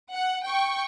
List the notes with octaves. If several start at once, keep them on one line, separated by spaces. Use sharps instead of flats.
F#5
G5 C#6